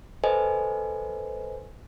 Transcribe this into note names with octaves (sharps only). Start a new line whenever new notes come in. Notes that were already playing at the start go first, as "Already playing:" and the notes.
A4 B4 C5 D#5 G#5